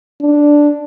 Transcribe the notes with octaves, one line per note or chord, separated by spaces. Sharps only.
D4